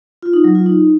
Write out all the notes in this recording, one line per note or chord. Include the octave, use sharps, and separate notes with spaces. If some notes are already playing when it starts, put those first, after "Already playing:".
F4
D#4
F#3
F4
D#4